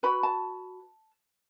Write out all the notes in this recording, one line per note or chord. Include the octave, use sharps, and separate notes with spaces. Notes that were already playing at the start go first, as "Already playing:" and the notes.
F#4 B4 B5
A5